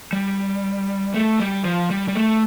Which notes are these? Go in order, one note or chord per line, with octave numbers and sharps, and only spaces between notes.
G3
A3
G3
F3
G3
G3
A3